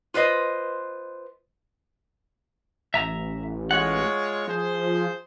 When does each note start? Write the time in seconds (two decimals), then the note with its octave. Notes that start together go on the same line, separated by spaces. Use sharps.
0.14 F4 B4 C5 D#5
2.94 A1 E5 A#5
3.71 G#3 F4 C#5 F#5
4.48 F3 G#4 C5